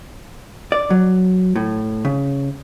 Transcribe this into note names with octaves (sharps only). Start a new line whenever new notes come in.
D5
F#3
A2
C#3